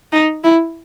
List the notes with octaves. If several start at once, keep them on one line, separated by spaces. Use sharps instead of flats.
D#4
E4